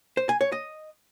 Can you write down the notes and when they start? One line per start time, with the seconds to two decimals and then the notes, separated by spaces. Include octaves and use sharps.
0.17 C5
0.29 G#5
0.41 C#5
0.52 D#5